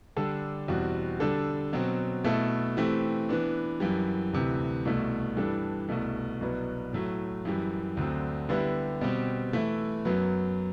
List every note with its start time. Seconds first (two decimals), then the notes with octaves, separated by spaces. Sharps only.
0.17 D3 G3 D4 A4
0.68 E2 B2 G3 C4 F#4
1.20 D3 G3 D4 A4
1.73 B2 F#3 C4
2.24 B2 A3 E4 A4
2.77 E3 A3 C4 G4
3.29 E3 B3 D4
3.80 F#2 E3 G3
4.33 D2 C3 E3
4.85 C2 B2 A3
5.37 G2 E3 G3 D4 A4
5.89 C2 B2 A3
6.41 C2 B2 F#3 B3
6.93 A2 F#3 A3
7.45 F#2 E3 G3
7.97 D2 D3 F#3 C4
8.49 D3 G3 B3 E4 G4
9.01 B2 G3 C4 G4
9.53 E3 A3 E4
10.05 F#2 F#3 B3